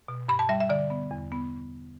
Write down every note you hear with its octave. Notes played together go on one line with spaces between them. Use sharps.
B2
G2 B5
A5
G3 E5
E5
D3 D5
B3
E2
B3